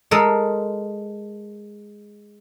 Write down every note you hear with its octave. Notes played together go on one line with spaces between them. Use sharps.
G#3 A4 A#4